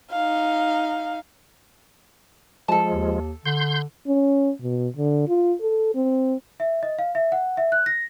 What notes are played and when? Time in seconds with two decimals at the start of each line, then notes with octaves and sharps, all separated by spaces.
0.11 D#4 F5
2.68 F3 G#3 A4 A5
2.93 D#2
3.46 D3 C6 G6
4.07 C#4
4.62 B2
4.96 D3
5.28 F4
5.61 A4
5.95 C4
6.60 E5
6.83 D#5
6.99 F5
7.15 E5
7.32 F#5
7.57 E5
7.72 F#6
7.86 A#6